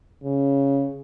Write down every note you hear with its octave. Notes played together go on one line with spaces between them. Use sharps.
C#3